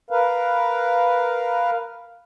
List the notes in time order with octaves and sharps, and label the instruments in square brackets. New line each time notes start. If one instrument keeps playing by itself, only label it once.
[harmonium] A#4 B4 F5